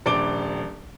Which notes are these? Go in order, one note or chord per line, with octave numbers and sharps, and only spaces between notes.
D#1 A#1 D5 D6 D7 G7